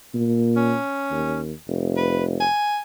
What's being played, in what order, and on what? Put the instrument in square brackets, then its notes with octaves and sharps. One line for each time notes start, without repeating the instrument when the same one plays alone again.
[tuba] A#2
[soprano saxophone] C#4
[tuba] D#2
F1
[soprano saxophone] B4
G#5